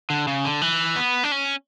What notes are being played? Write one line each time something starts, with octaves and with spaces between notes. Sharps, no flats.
D3
C#3
D3
E3
B3
D4
C#4